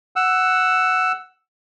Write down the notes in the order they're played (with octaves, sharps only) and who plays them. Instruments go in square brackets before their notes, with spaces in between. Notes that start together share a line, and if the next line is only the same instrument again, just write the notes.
[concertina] F#5 E6